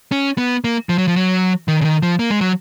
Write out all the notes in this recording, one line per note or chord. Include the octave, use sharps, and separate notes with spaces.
C#4
B3
A#3
F3
F#3
F3
F#3
D#3
C#3
D#3
F3
A#3
G#3
F#3